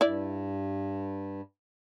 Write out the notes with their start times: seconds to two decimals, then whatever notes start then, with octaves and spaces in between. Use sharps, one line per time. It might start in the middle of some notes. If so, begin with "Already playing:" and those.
0.01 G2 E4 D5